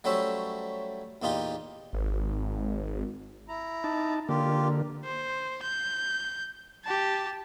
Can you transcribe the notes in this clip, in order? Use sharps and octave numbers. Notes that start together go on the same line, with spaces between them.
F#3 G3 A3 C#4 C5 E5
E2 A#2 D#4 F4 G4
G#1
E4 A#5
D#4 A5
D3 A#3 F4 G4
C5
G6
G4 A5